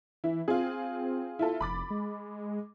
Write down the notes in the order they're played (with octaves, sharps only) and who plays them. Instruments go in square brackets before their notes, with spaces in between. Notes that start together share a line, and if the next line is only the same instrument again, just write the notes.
[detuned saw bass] E3 [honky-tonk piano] E4
[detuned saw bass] C4 [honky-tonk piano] F4 G#4
[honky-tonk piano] E4 F4 A4
[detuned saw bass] F1 [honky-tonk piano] B5 D6 A6
[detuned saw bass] G#3